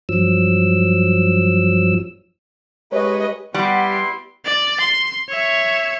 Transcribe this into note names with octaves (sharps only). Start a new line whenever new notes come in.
G2 F3 F#3 E6
G#3 G4 B4 C#5 D#5
G3 B3 E4 G4 B4 F#5 B5 C6
D5
C6
C#5 E5